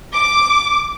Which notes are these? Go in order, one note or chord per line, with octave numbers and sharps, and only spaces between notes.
D6